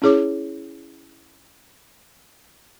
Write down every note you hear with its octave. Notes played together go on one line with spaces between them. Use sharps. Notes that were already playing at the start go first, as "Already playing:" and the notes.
C#4 E4 G#4 C#5 D6